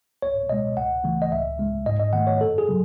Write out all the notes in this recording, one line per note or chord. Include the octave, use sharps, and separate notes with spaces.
C#2 C#5
B2 G#3 D#5
C#2 F#5
C#3 E3 A3
D#5
C#2 E5
C#3 G#3
G#2 D#5
D#5
D#3 A3 F#5
C#5
F#2 A4
G#4
C#3 F#3